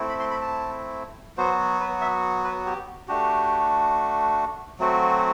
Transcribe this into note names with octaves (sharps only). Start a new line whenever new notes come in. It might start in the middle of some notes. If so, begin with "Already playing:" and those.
Already playing: A3 C4 E4
B5
C6
B5
A5
F#3 B3 F#4 C5
B4
E5
B4
G4
A3 D4 F#4 G4
F#3 A3 C4 F#4